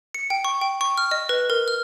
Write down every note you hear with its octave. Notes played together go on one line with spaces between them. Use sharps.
C#7
G5
C#6
G5
C#6
F6
D#5
B4
A#4
F6